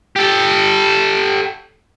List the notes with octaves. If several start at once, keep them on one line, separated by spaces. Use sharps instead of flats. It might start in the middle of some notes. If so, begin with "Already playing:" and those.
G4 A4